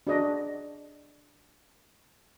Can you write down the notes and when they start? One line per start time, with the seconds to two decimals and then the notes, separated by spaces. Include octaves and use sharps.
0.07 D4 F#4 G#4 D5 D#5